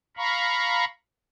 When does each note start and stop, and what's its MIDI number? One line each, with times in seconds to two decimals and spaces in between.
0.17 0.85 77
0.17 0.85 82
0.17 0.85 83
0.17 0.85 85